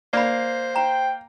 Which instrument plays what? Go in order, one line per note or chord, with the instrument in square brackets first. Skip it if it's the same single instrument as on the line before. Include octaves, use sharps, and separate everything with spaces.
[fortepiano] A#3 [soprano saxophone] C5 [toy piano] D5 B5
[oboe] G5 [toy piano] A#5